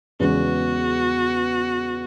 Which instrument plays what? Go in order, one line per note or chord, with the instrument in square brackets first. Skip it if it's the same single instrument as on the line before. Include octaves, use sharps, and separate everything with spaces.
[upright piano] E2 C#3 G#3 B3 [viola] F#4